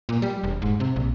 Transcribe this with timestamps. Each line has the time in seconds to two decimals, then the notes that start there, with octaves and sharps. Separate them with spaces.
0.09 A#2
0.22 G3
0.44 E1
0.62 G#2
0.80 C3
0.96 A#1